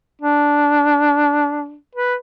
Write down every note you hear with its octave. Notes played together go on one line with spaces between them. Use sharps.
D4
B4